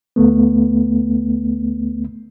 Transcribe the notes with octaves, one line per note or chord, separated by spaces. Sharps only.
D2 A3 B3